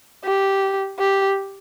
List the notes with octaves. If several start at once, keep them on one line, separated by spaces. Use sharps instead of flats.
G4
G4